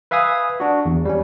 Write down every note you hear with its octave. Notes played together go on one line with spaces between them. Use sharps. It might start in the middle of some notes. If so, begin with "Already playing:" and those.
B4 E5 F5 G#5 D#6
D4 F#4
E2
G3 C#4